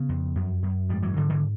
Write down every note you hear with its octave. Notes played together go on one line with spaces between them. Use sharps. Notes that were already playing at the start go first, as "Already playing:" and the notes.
Already playing: C#3 B3
F2
F#2
F#2
G#2 F3 G3
E3 F#3
G#2 D3 E3
D3 E3